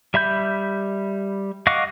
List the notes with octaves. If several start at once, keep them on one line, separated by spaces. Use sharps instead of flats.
G3 E5 B5 G6
D#5 F5 F#5 C#6 D6